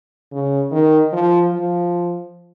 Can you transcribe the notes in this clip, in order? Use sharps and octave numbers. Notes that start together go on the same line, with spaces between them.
C#3
D#3
F3
F3